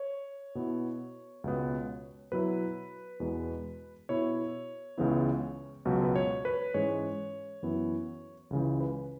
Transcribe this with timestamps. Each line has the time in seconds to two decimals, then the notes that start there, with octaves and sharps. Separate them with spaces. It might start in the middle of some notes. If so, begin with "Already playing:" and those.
Already playing: C#5
0.55 B2 B3 E4
1.44 C#2 B2 B3
2.32 B2 F#3 E4 B4
3.20 E2 B2 G#3
4.09 B2 B3 E4 C#5
4.98 C#2 C#3 E3 B3 E4
5.85 C#2 B2 F#3
6.04 B4
6.16 C#5
6.45 B4
6.74 G#2 E3 G#3 C#4 C#5
7.62 F#2 E3 B3 E4
8.50 C#2 C#3 E3
8.80 B4